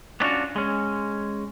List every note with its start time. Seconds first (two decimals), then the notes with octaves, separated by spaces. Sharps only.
0.20 B3 C#4 D4 F4 F#4
0.56 G#3 C#4